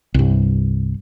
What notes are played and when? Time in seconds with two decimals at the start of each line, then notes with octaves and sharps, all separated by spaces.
0.14 C2 G2